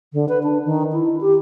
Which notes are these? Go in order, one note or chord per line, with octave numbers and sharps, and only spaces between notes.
D3
B4
D4
D#3
E4
G4